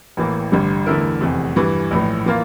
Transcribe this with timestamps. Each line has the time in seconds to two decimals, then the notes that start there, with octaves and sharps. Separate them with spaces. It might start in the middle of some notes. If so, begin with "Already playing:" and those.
0.17 A1 A2 E3 A#3
0.52 A1 G2 D3 G3
0.86 E2 D3 A3 E4 A#4
1.21 F1 E2 C3
1.56 G2 E3 G3
1.91 A#1 A2 E3
2.26 E3 A#3 F4